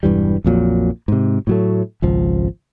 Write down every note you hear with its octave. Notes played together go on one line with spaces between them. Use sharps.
E1 G2 E3 G3
A#1 F2 A#2 F#3
G#2 C3
A2 F#3 A3
G#1 C#2 F3